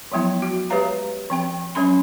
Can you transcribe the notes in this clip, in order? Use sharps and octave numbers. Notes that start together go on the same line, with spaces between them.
F3 F#3 G#3 B3 E4
F#4
G#3 G4 B4 C#5 F5 A#5
F3 C4 G5
F#3 G#3 C#4 B5 C6